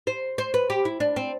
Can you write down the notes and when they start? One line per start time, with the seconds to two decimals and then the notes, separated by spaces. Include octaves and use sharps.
0.07 C5
0.38 C5
0.54 B4
0.70 G4
0.85 E4
1.00 D4
1.16 C4